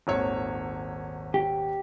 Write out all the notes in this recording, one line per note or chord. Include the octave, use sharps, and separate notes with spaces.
D#1 G#1 C#5
G4